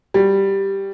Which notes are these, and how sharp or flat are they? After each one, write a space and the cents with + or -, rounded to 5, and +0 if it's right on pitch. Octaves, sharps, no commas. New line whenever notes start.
G3 +0 F#4 +0